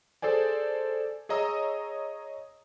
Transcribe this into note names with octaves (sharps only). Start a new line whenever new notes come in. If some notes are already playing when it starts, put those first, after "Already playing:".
G#4 A4 C5 D5 G#5
G#4 C#5 D#5 A#5 D#6 E6